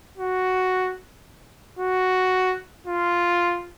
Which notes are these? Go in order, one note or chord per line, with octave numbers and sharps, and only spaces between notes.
F#4
F#4
F4